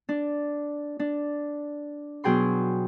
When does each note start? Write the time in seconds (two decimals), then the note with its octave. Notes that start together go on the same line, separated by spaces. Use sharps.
0.09 D4
0.99 D4
2.24 B2 F#3 G#4 G5 C6